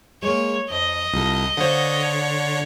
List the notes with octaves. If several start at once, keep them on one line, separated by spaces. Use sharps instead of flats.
G#3 A#3 C#5
F2 D#5
C2 F4 A4
D3 C5 C#5 F5 F#5